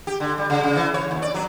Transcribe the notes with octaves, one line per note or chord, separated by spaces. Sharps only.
G4
D3
G3
C#3
C#3
E3
C#5
D#2
D5
F#3